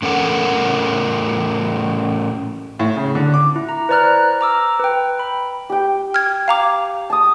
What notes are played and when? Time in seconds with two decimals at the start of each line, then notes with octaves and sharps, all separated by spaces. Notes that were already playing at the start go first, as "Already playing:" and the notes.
0.02 A2 C#4 A4 A#4 F#5
2.79 A2
2.96 C#3
3.15 D3
3.34 D6
3.56 E4
3.69 A#5
3.89 B4 C5 D5 A#5 F6 F#6
4.41 A#5 D6 E6 F6
4.80 B4 G5
5.19 B5
5.70 G4 G5
6.14 F6 G#6
6.48 F5 A#5 D6
7.10 A5 D#6